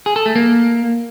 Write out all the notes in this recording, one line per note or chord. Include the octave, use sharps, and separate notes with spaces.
G#4
A4
A3
A#3